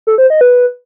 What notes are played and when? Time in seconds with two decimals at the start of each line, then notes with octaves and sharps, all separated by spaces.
0.07 A4
0.18 C5
0.30 D#5
0.41 B4